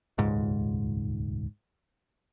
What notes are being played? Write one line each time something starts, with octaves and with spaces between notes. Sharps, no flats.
D#1 C#2 G#2